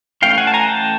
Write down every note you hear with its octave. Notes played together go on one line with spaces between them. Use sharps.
E3 A3 C#4 F5 G5
F#5 G#5
A5
G#5 A#5
G5 A5